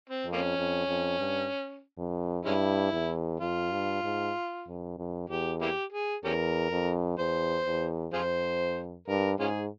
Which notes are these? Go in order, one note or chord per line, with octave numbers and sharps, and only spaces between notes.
C4
F2
F3 A#3 C#4
F2
F2
G2
F2
G2 G#3 C#4 E4
E2
F2 F4
G2
G#2
F2
F2
E2 G4
A#3 E4 G4
G#4
E2 C#4 G4 A#4
F2
E2 C5
E2
F2 F4 G#4 C5
G2 A#4
G#2 C#4 F4 G#4